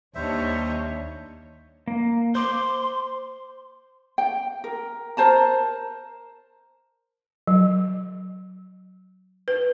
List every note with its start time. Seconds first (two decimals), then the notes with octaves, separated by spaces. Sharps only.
0.15 D#2 G3 D4 C5 C#5 D#5 E5
1.88 A#3
2.35 C5 C6 D6
4.18 G5
4.64 A#4
5.17 A#4 C5 A5 A#5
7.47 F#3
9.48 B4